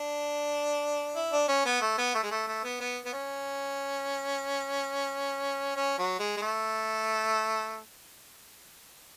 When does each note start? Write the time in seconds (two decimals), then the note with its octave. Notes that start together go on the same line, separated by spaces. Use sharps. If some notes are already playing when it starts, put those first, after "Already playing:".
Already playing: D4
1.15 E4
1.32 D4
1.48 C#4
1.65 B3
1.81 A3
1.98 B3
2.14 A3
2.23 G#3
2.31 A3
2.47 A3
2.64 B3
2.80 B3
3.05 B3
3.13 C#4
5.76 C#4
5.99 F#3
6.19 G#3
6.37 G#3
6.42 A3